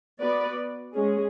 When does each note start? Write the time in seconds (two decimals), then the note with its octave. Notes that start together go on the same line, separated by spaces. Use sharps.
0.20 B3 F#4 B4 D5
0.95 G#3 C#4 G#4